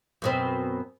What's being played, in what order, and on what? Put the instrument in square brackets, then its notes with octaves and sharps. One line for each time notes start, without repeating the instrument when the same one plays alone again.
[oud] F#2 B2 C4